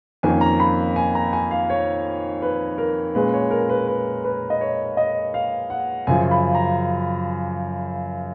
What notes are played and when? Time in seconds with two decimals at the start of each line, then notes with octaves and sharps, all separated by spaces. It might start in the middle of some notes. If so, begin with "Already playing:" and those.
0.23 F2 D#3 A#3 C#4 G#5
0.41 A#5
0.60 B5
0.96 G#5
1.15 A#5
1.33 G#5
1.51 F5
1.70 C#5
2.42 B4
2.78 A#4
3.15 A#2 G#3 C#4 B4
3.34 C#5
3.51 A#4
3.69 B4
3.88 B4
4.25 B4
4.50 D#5
4.61 C#5
4.97 D#5
5.34 F5
5.70 F#5
6.07 F#2 C#3 F3 G#5
6.31 B5
6.55 A#5